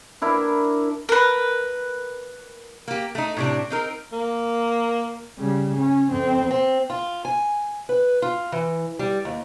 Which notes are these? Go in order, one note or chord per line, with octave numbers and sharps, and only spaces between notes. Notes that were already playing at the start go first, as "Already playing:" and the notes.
D4 E4 A#4
A#4 B4
A#3 G4
A3 D#4
A2 C3 D4
C4 D#4 A#4
A#3
C#3 G3
C#4
F2 C4
C4
F4
G#5
B4
F4
E3
G3
D#2